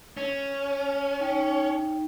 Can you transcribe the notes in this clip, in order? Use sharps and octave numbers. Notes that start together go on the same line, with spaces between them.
C#4
D#4 G5